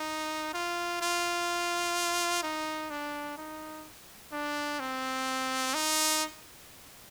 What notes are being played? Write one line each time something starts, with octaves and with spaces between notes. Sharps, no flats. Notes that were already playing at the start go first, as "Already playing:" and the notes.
Already playing: D#4
F4
F4
D#4
D4
D#4
D4
C4
D#4